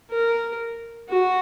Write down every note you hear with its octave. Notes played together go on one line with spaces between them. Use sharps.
A#4
F#4